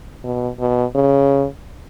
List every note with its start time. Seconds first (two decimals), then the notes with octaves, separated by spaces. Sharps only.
0.24 B2
0.59 B2
0.95 C#3